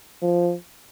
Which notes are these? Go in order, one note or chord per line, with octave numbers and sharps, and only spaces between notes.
F3